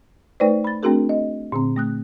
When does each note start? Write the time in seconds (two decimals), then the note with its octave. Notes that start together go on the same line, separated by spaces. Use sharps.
0.40 A3 D#4 B4 C5 D5
0.64 B5 A6
0.83 A3 C4 D4 F#4 G#4 A#4
1.09 D#5
1.52 A#2 D3 C4
1.76 A3 D#6 F#6